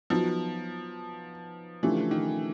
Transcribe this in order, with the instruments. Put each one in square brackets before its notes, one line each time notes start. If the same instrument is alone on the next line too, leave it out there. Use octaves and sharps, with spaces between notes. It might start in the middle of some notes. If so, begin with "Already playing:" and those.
[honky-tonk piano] F3 [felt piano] F#3 B3 D#4 F#4
[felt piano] C#3 F3 A3 D4 G4 [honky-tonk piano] E3
[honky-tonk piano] D#3